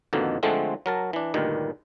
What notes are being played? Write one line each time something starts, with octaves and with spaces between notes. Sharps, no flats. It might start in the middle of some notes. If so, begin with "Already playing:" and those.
F2 B2 D3 D#3 A#3
D3 F3 G#3 A3 C4
F#3 A#4 A5
E3 D4
D2 G2 A#2 D#3 G3